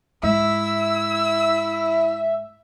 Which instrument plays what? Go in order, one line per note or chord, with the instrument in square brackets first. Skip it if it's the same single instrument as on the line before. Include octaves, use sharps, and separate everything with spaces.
[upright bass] G#2 G#3 [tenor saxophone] E4 [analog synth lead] E5 [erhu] E6